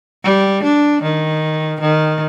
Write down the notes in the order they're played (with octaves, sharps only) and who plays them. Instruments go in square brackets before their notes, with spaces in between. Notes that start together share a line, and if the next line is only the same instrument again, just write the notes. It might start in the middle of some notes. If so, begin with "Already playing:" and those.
[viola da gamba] G3
D4
D#3
D#3